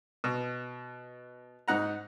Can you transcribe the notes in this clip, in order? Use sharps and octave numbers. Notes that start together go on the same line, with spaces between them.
B2
G#2 D#4 F#5 A#5